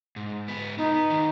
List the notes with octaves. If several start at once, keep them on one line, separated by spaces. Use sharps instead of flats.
G#2
B3
B3 D#4
D#3